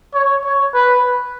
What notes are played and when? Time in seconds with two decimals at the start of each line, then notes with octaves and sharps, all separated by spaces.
0.14 C#5
0.45 C#5
0.74 B4